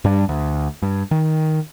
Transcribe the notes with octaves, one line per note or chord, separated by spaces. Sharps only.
G2 G3 D4
D2
G2
D#3